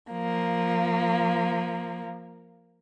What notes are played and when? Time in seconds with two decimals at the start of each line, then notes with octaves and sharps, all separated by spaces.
0.12 F3 A#3